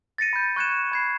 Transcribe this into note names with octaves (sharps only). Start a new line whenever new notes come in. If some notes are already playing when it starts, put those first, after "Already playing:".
A6 A#6 C#7 D#7
B5 G6
C#6 F#6 G#6 C#7 E7
B5 G#6 C7